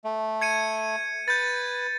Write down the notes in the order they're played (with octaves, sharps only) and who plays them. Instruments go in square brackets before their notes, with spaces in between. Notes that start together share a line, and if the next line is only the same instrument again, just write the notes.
[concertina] A3
[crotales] G#6 C#7 D#7
[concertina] B4 [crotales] G6 A6